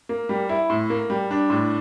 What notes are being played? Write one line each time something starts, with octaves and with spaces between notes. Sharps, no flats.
A#3
G3
E4
A2
A#3
G3
D4
A2